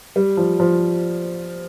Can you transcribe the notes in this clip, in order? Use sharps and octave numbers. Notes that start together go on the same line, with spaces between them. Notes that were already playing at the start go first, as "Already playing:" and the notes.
G3
F3
F3